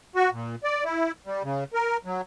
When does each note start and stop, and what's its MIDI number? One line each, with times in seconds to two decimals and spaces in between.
0.15 0.30 66
0.32 0.55 46
0.64 0.84 74
0.85 1.12 64
1.26 1.43 55
1.44 1.64 49
1.74 1.97 70
2.05 2.21 54